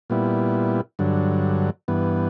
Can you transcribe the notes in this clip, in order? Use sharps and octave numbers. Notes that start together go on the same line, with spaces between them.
A#2 G3 B3 E4
G2 D3 F#3
G2 E3 B3